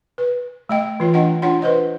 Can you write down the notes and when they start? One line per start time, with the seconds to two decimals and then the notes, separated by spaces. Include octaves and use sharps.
0.18 B4
0.69 A3 D#5 G5
1.00 E3 F4 C#5
1.14 D4 F4 D#5 F#5 G5
1.42 D4 F4 C#5 F#5 C6
1.62 B4 C5 D#5